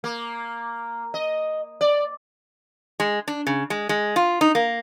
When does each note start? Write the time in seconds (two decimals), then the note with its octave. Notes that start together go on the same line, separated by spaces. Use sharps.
0.04 A#3
1.14 D#5
1.81 D5
3.00 G#3
3.28 D4
3.47 C#3
3.70 G#3
3.89 G#3
4.16 F4
4.41 D#4
4.55 A#3